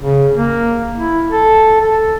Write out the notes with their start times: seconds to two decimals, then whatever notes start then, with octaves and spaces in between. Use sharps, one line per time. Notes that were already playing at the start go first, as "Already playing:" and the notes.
0.02 C#3
0.36 A#3
0.96 E4
1.31 A4
1.80 A4